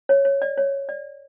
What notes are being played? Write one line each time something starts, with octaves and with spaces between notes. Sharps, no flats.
C#5
C#5
D5
C#5
D5